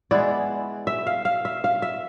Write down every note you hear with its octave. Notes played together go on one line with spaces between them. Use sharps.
E3 G#3 B3 E4 D5
E5
F5
F5
E5
F5
E5